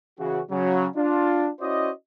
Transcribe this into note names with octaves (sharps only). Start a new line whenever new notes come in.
C#3 E3 F#4
C#3 F#3
D4 F4
C#4 E4 F#4 C5 D5 D#5